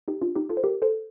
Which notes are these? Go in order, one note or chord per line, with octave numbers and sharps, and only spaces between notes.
D#4 G4
D4 F4
D#4 G4
F4 A4
C5
G4 A#4
A4 C5